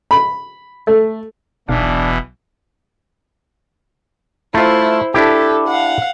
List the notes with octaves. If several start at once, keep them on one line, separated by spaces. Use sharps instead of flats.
B5
A3
F1 B1 B2 E3 D4 F5
A3 E4 F4 C5
D4 E4 G4 A4
F5 F#5